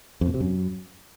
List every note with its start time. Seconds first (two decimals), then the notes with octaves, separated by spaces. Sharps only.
0.21 F2
0.28 A#2
0.34 C3
0.40 F#2